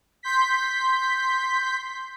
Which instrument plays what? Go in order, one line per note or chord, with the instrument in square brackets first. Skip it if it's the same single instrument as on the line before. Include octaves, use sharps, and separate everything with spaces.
[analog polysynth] C6 G6 B6